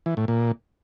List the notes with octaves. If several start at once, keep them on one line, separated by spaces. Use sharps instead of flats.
E3
A2
A#2